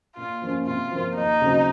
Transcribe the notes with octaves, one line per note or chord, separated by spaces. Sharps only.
A#2 F4
F3 A#3 C#4
C3 F4
F3 A#3
D#2 D#4
C#3 F#3 C4